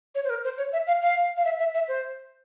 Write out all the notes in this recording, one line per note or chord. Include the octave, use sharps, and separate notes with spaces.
C#5
C5
A#4
C5
C#5
E5
F5
F5
F5
E5
E5
E5
C5